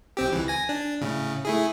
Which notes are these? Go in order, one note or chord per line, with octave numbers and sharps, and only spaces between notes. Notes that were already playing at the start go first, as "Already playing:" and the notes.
B1 C4 G4
C#2 E3
G#5 A#6
D4
A2 C#3
A3 E4 G#4